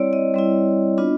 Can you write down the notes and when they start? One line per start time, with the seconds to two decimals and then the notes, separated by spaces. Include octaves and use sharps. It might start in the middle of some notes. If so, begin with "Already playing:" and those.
Already playing: G3 C4 E4 C#5 D5
0.13 D#5
0.34 G3 C4 E4
0.98 B3 D4 F4